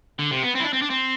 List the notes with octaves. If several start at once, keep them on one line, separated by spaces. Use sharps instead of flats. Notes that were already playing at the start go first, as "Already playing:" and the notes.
D3
C3
B3
C4
E4
D4
C4
D4
C4